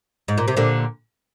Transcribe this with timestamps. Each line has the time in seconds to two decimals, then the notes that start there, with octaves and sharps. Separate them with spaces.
0.28 G#2
0.38 A#2
0.48 C3
0.57 A#2 D3